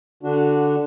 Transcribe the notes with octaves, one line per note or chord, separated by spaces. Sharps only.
D3 D4 F#4